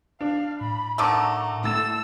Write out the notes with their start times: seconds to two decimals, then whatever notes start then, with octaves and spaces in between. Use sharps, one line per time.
0.21 D4 F5
0.61 A2 B5
0.98 D3 D#3 A3 A#5 C#6 D6 E6
1.64 A2 E6 A6 E7